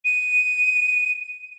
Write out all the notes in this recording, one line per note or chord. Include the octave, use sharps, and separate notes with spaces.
D#7